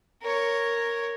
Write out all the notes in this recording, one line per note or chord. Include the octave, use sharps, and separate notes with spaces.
A#4 C#5